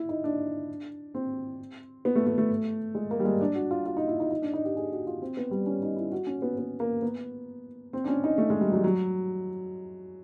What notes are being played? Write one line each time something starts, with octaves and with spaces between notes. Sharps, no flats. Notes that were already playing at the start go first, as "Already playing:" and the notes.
Already playing: E4
D#4
D4
C4
B3
A3
A3
A3
G#3
A#3
G3
G#3
D4
F#4
F4
F4
D#4
E4
D#4
D#4
D4
D#4
G4
G#4
F#4
F4
C4
B3
G3
C#4
D#4
E4
F#4
C#4
B3
B3
A#3
B3
C4
D4
C#4
D#4
A3
G#3
G3
F#3
F#3